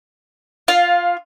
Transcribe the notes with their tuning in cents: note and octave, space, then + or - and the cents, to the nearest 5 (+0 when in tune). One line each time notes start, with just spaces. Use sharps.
F4 +0 F5 +15